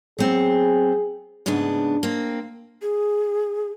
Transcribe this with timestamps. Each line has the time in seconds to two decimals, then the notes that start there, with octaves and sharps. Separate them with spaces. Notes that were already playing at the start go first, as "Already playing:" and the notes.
0.19 F#3 B3 C4 G#4
1.46 D2 G#2 C#3 B3 D4
2.03 A#3 C4
2.82 G#4